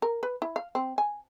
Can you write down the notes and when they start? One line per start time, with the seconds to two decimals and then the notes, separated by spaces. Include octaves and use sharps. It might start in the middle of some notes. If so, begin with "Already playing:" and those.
0.02 A#4
0.23 B4
0.42 E4
0.56 F5
0.75 C4
0.98 G#5